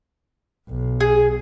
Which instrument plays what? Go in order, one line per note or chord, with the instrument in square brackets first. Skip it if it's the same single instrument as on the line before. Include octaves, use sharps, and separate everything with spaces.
[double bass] B1
[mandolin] G#4